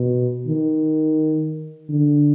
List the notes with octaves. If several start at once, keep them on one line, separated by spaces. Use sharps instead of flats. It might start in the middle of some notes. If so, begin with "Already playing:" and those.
Already playing: B2
D#3
D3